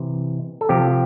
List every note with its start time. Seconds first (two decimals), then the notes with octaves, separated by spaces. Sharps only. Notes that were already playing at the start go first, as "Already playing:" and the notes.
Already playing: C3 E3
0.61 A4
0.69 C3 F3 G4